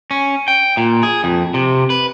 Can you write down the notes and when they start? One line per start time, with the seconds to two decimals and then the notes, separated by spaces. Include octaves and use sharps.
0.11 C#4
0.48 G5
0.77 A#2
1.03 G#4
1.24 F2
1.54 C3
1.90 B4